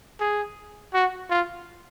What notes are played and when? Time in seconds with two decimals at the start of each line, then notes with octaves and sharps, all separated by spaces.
0.20 G#4
0.94 F#4
1.30 F4